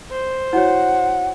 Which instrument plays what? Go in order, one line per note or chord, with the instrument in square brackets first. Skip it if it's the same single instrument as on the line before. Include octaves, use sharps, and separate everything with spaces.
[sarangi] C5
[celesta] E4 F#4 C#5 [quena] F#5